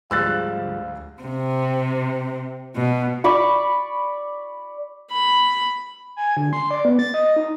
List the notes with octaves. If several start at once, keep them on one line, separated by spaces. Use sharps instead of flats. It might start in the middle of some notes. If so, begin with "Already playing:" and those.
D2 G#2 F3 G3 F5 E6 F#6 A6
C3
B2
D5 B5 C#6 D6
B5
G#5
D3
C6
D5
B3
A6
D#5
D#4